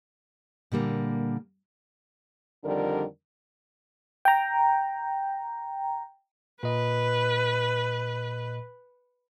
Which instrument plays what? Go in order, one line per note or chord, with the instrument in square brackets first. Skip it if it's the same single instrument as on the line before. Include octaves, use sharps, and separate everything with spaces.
[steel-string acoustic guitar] A#2 D3 G3 A#3
[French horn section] F2 D3 D#3 G3 A#4
[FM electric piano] G5 A#5
[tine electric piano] A#2 D#5 [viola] B4